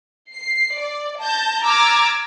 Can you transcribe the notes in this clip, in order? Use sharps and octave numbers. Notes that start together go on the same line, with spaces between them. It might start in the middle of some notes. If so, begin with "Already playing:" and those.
C7
D5
A5 G6 A#6
A#5 D6 E6 F6 G#6 A6